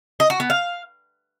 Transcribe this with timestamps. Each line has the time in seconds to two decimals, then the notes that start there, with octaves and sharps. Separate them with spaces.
0.20 D#5
0.30 F#4
0.40 B3
0.50 F5